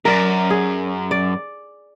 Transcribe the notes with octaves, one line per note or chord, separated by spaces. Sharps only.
F#2 A#4 D5
G#4
D5